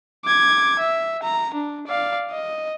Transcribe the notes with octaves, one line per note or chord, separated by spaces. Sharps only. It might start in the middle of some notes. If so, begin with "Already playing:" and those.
D6 G#6
E5
A#5
D4
D5 F5
D#5